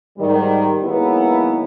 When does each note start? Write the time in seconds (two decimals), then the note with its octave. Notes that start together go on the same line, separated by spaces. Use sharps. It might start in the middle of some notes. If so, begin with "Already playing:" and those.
0.18 G#2 D#3 G3
0.84 D#3 F#3 G#3 A#3 B3 E4